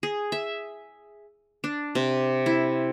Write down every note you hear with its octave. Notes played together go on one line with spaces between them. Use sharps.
G#4
E5
D4
C3
E4